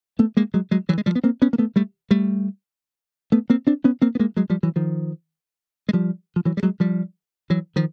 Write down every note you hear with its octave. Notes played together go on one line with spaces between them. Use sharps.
A3 B3
G#3 A#3
F#3 G#3
F#3 G#3
E3 F#3
G#3
F3 G3
B3
A#3 C4
B3 C#4
A#3
A3 B3
G3 A3
G3 A3
A3 B3
A#3 C4
C4 D4
B3 C#4
A#3 C4
B3
G#3 A#3
F#3 G#3
F3 G3
E3 F#3
D#3 F3
G#3
F3 G3
F3
E3 F#3
G3
F#3 G#3
F3 G3
E3 F#3
D#3 F3